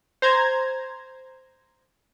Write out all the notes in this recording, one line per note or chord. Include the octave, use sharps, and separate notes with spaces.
C5 A#5 G#6